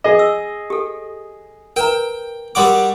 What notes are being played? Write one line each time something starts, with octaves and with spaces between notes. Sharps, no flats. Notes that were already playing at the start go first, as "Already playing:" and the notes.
G#4 D#5
E6
G4 A4
A#4 B4 G5 A#5
G3 F#4 A#4 C6 D6 D#6